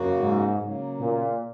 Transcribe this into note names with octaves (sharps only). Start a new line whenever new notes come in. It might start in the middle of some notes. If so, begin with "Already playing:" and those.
Already playing: F#2 C#3 A#3 F#4
G#2
C#3 F#3 A#3
A#2